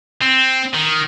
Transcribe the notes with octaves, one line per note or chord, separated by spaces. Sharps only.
C4
D#3